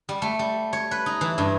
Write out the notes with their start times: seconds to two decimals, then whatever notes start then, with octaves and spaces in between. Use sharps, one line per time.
0.09 G3
0.22 A3
0.39 G3
0.73 C#5
0.91 B4
1.06 D#4
1.21 E3
1.38 G2